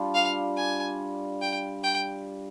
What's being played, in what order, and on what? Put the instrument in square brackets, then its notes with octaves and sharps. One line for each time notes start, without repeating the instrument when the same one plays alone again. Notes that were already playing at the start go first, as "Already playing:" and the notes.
Already playing: [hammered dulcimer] G3 D4 F4
[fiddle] F5
G#5
G5
G5